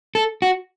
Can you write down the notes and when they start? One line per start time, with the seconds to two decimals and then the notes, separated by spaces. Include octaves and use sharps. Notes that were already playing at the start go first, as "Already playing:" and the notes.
0.15 A4
0.42 F#4